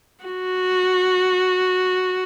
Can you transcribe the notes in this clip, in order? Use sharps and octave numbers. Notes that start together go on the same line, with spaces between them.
F#4